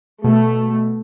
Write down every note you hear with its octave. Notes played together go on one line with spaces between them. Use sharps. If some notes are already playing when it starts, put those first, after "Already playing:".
B2 A3